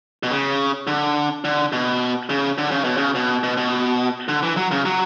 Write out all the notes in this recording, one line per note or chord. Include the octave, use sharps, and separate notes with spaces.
B2
C#3
D3
D3
B2
C#3
D3
C#3
B2
C#3
B2
B2
B2
D3
E3
F#3
C#3
F#3